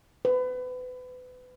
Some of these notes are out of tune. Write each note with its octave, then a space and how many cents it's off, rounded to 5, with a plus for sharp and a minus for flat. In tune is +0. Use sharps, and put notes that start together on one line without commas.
B4 +30